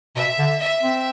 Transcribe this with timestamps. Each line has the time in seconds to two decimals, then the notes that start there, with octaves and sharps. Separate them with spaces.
0.16 B2 E5
0.39 D3
0.60 E5
0.83 C4